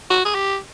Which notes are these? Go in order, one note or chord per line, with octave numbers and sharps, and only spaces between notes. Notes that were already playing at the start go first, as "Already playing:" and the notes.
F#4
G#4
G4